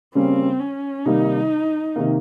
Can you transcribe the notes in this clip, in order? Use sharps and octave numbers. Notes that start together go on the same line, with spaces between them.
C#3 G3 A#3 C4 C#4
C#4
C3 D#3 G3 A#3 D#4
C3 D#3 A#3